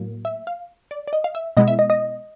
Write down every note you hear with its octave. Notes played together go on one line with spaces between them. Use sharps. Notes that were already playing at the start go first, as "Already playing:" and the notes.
Already playing: A2 F#3 A#3
E5
F5
D5
D5
D#5
F5
E5
B2 G#3 B3 E4 D#5
E5
D#5
D#5